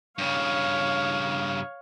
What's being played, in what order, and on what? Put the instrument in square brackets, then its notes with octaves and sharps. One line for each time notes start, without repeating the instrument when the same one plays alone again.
[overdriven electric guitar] G2 C#3 [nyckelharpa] C#5 F5